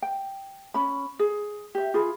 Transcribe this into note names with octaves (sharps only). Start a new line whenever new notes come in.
G5
C#4 B5
G#4
G4 E5
F4 G#4 B5